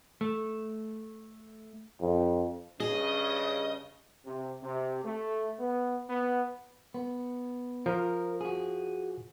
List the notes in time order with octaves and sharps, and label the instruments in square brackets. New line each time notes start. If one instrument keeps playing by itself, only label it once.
[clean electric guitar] A3
[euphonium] F2
[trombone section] G2 C#3 [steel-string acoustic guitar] G#4 [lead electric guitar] D#5
[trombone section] C3
C3
A3
B3
B3
[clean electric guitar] B3
[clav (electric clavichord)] F3 [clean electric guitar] A#4
[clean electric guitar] F#4 G#4